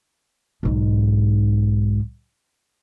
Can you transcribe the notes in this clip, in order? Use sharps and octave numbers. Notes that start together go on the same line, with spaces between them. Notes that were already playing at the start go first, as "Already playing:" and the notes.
B1 G#2